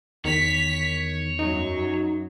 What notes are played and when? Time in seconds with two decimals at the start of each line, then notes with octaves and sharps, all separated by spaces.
0.25 E2 D#3 C#5 B6
1.39 F#2 F#3 D#4